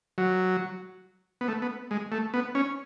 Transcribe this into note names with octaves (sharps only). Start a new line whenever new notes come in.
F#3
B3
A3
B3
G#3
A3
B3
C#4